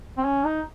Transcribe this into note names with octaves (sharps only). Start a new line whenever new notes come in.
C4
C#4
D#4